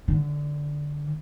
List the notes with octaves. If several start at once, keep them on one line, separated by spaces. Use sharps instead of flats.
D3